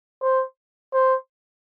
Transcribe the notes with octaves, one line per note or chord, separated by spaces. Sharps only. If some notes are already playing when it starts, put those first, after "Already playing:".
C5
C5